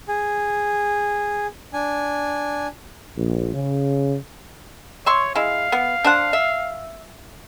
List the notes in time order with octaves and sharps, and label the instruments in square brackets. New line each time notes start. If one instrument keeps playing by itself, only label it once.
[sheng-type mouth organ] G#4
D4 G#5
[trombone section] A#1
C#3
[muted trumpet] C#5 [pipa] E5 C6 C#6
[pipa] G#3 E4 [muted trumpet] F5
[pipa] B3
D4 C5 F#5
E5